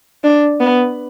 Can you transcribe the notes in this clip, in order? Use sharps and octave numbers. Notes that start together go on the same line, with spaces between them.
D4
B3